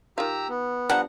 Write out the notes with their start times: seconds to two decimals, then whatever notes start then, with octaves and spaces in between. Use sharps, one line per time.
0.18 D#3 F4 G4 A#5 E6
0.49 B3
0.90 F3 G3 D4 F#5 A#5